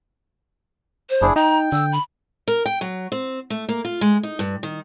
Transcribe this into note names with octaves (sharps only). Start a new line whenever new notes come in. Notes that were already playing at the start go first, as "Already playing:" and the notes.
C5
F#1 D4 E4 G#4
D#4 G5 A#5
D3 E6
B5
A#4
G5
F#3
C4
A3
A#3
F4
G#3
D#4
G2
D#3